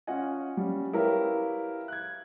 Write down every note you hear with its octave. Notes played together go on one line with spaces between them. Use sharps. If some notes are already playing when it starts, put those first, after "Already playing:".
C#4 F4 D#5 F#5 G#5
G3 C#4
E4 G4 A#4 B4 C#5 F5
F#6 G#6